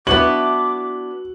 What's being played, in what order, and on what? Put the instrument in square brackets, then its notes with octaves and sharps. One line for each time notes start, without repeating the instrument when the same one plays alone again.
[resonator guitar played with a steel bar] B3 D4 E4 [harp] F#4 [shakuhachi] D6 [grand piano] F#7